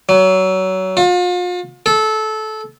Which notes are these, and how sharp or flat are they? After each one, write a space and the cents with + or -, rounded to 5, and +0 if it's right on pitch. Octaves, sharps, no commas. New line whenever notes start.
F#3 +25
F4 +40
A4 -20